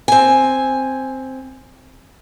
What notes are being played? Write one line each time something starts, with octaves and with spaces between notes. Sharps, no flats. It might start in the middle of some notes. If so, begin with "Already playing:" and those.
C4 G#5